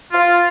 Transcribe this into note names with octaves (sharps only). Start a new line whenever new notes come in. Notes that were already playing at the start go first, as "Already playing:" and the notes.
F4